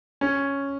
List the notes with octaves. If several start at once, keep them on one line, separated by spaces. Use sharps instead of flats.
C#4